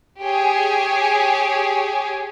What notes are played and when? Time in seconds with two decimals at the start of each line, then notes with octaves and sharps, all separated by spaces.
0.20 G4 G#4 C#5 G#5